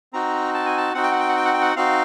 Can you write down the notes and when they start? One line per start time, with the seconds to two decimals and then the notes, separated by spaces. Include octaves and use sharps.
0.13 C4 D#4 F#4 A#5
0.54 A5
0.66 G#5
0.77 A5
0.94 C4 D#4 F#4 F#5
1.03 G5
1.12 F#5
1.20 G5
1.28 F#5
1.37 G5
1.45 F#5
1.54 G5
1.62 F#5
1.76 C4 D#4 F#4 F5